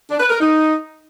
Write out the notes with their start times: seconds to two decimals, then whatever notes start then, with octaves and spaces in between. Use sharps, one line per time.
0.10 D4
0.20 B4
0.30 A#4
0.40 D#4